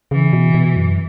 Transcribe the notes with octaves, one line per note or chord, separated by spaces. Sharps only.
C#3 E3
B2
B2
F#2